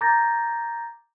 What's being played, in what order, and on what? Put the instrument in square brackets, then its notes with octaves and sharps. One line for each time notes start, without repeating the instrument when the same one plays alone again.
[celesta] A#5 D6 G6 A6 A#6